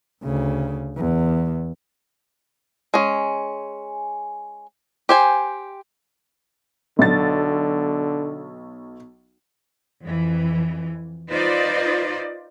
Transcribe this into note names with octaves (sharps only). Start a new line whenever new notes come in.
D2 C#3
E2
G#3 C#4
G4 C5 G#5
B1 D3 A6
F2 E3
D#4 F4 B4 C5 D5